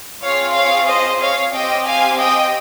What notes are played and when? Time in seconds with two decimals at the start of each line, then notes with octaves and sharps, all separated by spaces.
0.22 C4 F4 G#4 C#5 F5
0.55 C#5 F5
0.88 C5 D#5
1.21 C#5 F5
1.54 C4 G4 D#5 G5
1.86 F5 G#5
2.20 D#5 G5